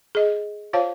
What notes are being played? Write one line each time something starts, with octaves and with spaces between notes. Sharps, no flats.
G#4 D#5
F4 C5 C#5 F5 A5